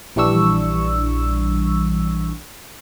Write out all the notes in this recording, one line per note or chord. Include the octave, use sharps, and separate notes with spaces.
A#1 E3 G3 D4 C#6 E6